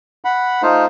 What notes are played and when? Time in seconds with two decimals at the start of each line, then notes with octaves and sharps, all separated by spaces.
0.25 F#5 B5
0.62 A3 D#4 F4 C5